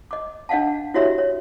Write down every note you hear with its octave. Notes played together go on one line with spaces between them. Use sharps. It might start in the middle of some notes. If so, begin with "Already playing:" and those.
D#5 D6
D4 D#5 F5 F#5 A5
E4 F#4 G4 C#5 D#5 E5
C#5